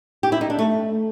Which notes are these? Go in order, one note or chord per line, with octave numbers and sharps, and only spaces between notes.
G4
E4
D#4
D4
A3